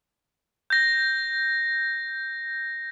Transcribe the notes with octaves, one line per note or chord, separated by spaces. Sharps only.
G6 A#6